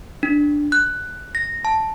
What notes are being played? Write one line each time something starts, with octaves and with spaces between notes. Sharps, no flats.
D4
F#6
A#6
A5